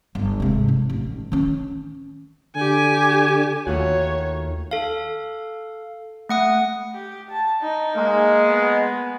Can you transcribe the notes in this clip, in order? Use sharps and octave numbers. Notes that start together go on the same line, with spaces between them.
G1
G#2 C3
D#4
A1
D#3 C#4
D3 G4 G#5
D#2 D#3 A3 F4 F#4 C#5
A4 F5
A3 F#5 D#6
G4
A5
D#4
G#3 A#3
B3